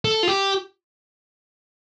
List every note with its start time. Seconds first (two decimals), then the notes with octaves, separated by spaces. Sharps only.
0.05 A4
0.23 F4
0.28 G4